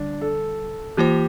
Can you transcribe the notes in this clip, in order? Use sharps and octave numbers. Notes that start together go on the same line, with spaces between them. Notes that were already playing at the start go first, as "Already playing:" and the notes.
Already playing: D3 G3 D4
A4
E3 A#3 F4 G4 C5